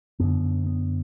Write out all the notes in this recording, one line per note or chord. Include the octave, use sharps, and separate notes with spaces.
F#2 D3 B3
B3